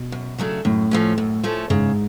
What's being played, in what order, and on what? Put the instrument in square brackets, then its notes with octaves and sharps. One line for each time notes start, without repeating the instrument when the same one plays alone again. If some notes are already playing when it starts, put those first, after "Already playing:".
Already playing: [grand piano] B2
[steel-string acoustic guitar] F#2
C#3 F#3 A3 D4
[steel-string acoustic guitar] F#2 [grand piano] A2
[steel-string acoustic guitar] F3 A3 C#4
F#2
F3 A3 C#4
[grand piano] G#2 [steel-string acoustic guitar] C#3